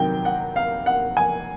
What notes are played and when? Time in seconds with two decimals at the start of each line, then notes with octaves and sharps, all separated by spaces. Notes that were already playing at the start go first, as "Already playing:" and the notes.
Already playing: C3 D#3 F#3 G5
0.25 F#5
0.56 F5
0.86 F#5
1.17 G#5